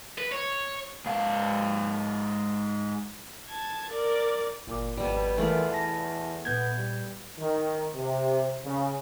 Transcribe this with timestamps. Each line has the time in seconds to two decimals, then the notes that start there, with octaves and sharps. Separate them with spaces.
0.18 B4
0.32 C#5
1.06 G#2 F5
3.48 A5 G#6
3.90 A#4 D5
4.67 G1 A#2 D6
4.97 G#1 F2 B2 G3 D5
5.38 E2 E3 A3 E4 F4 A#4 D5 G#5
5.72 A5 A#6
6.45 A#2 B3 G6 G#6
6.76 G3
7.38 D#3
7.95 C3
8.65 C#3